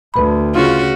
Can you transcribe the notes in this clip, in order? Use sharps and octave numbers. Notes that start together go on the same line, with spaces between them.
D2 B4 B5
C#3 C#4 F4 F#4